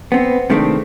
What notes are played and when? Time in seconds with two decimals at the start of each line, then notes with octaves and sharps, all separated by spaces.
0.12 B3 C4
0.50 C3 D#3 G#3 A3 C4 D4